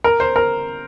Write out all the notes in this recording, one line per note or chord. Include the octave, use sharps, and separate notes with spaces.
A#4
C5
A#4